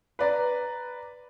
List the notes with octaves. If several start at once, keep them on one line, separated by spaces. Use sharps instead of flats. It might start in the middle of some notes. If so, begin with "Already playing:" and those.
B4 D5 A#5